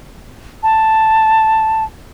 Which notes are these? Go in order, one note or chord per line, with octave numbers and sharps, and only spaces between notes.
A5